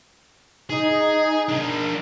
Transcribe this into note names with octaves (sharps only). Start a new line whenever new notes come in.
D#4 G#4
D4 A#4